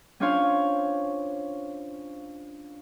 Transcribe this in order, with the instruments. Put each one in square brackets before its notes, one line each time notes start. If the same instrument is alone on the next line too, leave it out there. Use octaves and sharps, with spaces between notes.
[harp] C#4 D4 F4 C5 C#5 F5